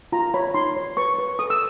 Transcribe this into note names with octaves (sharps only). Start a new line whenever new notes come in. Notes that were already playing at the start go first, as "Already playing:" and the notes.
F4 A#5
C#5 B5
D#4 C6
C#5
B4 C#6
B4
A4 D#6
E6